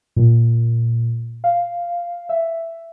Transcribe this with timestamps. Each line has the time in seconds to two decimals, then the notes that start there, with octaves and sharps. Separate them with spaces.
0.16 A#2
1.44 F5
2.29 E5